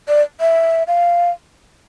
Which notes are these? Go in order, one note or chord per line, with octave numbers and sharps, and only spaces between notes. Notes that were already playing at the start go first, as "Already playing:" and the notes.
D5
E5
F5